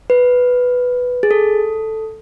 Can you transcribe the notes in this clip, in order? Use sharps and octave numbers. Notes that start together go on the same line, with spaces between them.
B4
G#4
A4